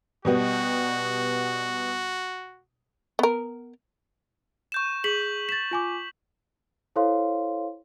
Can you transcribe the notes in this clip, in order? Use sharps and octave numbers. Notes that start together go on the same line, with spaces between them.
B2 G3 B3 F#4
B3 A#4
C#6 G6 E7
G#4 B6 F#7
A6 B6 E7
F4 G#5 D6
E4 A4 C5 C#5 F5 C6